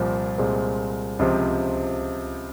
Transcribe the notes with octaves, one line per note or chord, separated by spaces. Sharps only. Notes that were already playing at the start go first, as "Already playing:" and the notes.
Already playing: C2 A#2 F3
C2 A#2 G#3 C4
C#2 C3 F3 C4